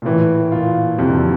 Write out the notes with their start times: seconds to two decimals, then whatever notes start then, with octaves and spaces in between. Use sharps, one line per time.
0.02 A#2
0.05 A2 E3
0.52 A#2 F4
0.98 F2 C3
1.09 D3
1.19 C3